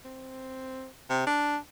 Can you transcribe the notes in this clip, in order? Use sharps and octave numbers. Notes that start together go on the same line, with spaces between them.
C4
C3
D4